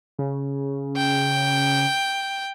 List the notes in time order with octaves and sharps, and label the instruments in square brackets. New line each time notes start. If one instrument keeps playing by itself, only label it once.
[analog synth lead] C#3
[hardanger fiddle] G5